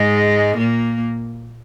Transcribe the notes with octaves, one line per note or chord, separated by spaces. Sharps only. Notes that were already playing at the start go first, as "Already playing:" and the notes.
Already playing: G#2 G#3
A#2 A#3